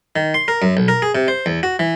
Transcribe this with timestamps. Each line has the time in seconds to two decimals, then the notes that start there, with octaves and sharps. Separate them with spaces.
0.16 D#3
0.34 C6
0.48 A#4
0.62 F#2
0.77 B1
0.88 A#4
1.02 G#4
1.15 C3
1.28 C5
1.46 E2
1.63 F#4
1.79 E3